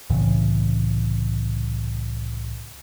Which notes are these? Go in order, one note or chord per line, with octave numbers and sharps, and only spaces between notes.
C2 A2 C#3 E3